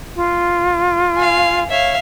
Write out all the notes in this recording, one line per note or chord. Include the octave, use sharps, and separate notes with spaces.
F4
F5 G#5
C#5 E5 F5